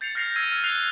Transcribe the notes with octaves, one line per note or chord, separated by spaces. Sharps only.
G6 A6 C7 C#7 F7
F6 G6 A#6 C7 C#7 F7
E6 F6 G6 G#6 A#6 D#7
F6
F#6 G#6 A#6 C7 F7 G7
F6